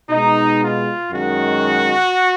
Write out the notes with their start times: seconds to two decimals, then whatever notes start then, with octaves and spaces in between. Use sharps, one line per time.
0.10 B2 G#3 D#4
0.62 F4
1.12 F#2 D#3 G#3 F#4